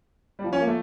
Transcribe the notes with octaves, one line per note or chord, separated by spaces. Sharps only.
G3
F3
C#4
A#3
A3